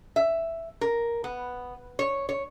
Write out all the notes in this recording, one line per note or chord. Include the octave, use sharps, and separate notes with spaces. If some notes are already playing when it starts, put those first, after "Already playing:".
E5
A#4
B3
C#5
C#5